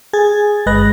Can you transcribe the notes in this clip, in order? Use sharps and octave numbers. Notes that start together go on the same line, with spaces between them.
G#4 G#6 A6
G1 G#3 B4 D#5 F#6 A#6